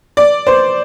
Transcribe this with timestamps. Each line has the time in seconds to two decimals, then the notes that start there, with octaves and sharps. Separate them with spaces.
0.17 D5
0.47 C5